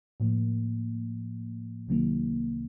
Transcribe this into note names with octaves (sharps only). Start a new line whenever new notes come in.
A2 F3 A#3
C2 C3 D#3 F#3 A#3